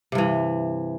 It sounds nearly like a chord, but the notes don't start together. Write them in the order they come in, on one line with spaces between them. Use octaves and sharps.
C3 G2 E3